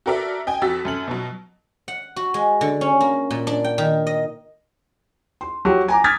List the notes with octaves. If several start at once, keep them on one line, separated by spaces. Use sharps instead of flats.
F#4 A4 A#4 D5 E5
D#5 G5 G#5
F2 F#4 E6 A6 B6
F#2 A4 F#7
B2 F#3
F#5
F#4
G#3
D3
C#4
A#3
A#2
D4
G5
D#3
D#5
C6
F#3 G4
G#5 A#5 D6
D6 D#6 F6 G#6 A6 B6